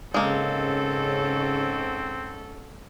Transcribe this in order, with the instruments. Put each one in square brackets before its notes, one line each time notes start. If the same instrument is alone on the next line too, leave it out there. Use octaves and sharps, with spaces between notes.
[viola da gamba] G#2 C#4 A4 [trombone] C#3 [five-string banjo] G#3 A#3 [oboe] C4